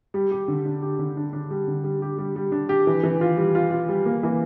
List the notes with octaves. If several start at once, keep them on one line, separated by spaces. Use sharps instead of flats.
G3
G4
D3
D4
G4
D3
D4
D4
G3
D3
G3
G4
G3
G3
D4
G4
E3
E3
F4
G3
F4
F4
G3
A#3
E3